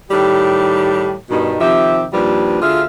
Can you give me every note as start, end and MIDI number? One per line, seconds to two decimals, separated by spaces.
0.11 1.14 45
0.11 1.14 51
0.11 1.14 55
0.11 1.14 67
1.30 1.57 43
1.30 1.57 47
1.30 1.57 51
1.61 2.05 48
1.61 2.05 51
1.61 2.05 53
1.61 2.05 67
1.61 2.05 76
2.13 2.58 39
2.13 2.58 46
2.13 2.58 53
2.13 2.58 55
2.13 2.58 62
2.13 2.58 71
2.62 2.85 38
2.62 2.85 50
2.62 2.85 65
2.62 2.85 68
2.62 2.85 76
2.62 2.85 77